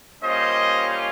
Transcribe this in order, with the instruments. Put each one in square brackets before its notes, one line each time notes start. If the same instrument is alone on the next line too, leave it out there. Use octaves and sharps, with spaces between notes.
[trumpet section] G3 A#3 C#4 F4 C5 D#5